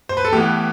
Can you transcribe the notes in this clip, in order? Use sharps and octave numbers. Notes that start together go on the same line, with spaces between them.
C5
B4
A4
A2 E3 B3 G4